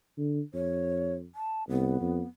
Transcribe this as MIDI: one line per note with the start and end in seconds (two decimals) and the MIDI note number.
0.17 0.40 50
0.54 1.26 41
0.54 1.14 73
1.35 1.63 81
1.69 2.00 36
1.69 2.26 59
2.00 2.21 41